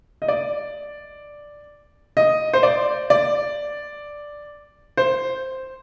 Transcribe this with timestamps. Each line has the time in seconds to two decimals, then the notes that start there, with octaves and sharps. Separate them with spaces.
0.22 D#5
0.28 D5
2.17 D#5
2.53 C5
2.63 D5
3.10 D5
4.97 C5